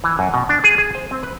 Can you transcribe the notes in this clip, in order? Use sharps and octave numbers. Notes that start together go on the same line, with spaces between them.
E3
F#2
B2
D4
G#4
G#4
C5
C4
B4